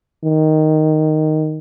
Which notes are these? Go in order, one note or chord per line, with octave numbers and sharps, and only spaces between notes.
D#3